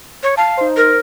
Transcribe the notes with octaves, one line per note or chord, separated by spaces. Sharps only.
C#5
F5 A5
D#4 C5
A#4